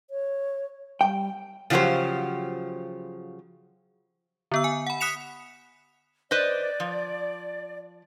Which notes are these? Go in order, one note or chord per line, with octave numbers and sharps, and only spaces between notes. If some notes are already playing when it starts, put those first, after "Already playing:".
C#5
G3 G5
C#3 F3 F#3 F4 G4 C5
D3 B3 E6
G#5
F#5 B5
D#6 F#6 B6 C#7 E7 F7
B4 C5 D5 D#5
F3